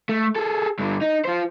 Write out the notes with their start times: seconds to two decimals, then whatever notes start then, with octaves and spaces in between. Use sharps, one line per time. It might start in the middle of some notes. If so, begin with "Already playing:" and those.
0.09 A3
0.36 G#4 A4
0.80 G2 D3
1.02 D#4
1.25 F4 C5